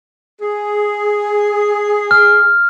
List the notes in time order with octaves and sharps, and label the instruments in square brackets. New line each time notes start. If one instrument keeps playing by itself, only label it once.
[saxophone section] G#4
[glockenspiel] F6